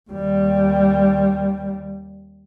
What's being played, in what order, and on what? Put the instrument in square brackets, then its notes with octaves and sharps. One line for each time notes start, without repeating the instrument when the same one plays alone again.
[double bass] D#2 G3